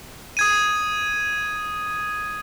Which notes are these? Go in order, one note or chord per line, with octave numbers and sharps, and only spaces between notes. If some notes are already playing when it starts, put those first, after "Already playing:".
D#6 G#6 D#7